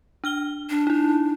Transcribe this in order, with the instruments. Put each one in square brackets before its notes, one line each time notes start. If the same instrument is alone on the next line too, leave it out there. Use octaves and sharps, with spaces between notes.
[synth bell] D4 F6 G7
[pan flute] D4
[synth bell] D#4 E4